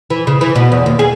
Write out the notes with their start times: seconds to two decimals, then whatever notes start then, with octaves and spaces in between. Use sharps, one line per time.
0.10 E3
0.27 C#3
0.41 E3
0.56 B2
0.72 E2
0.86 D#2
0.99 G#4